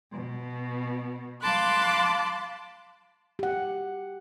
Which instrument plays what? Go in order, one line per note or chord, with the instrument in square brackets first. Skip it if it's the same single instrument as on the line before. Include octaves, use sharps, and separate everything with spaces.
[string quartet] B2
F5 A5 B5 C6 D6 F#6
[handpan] G4 F#5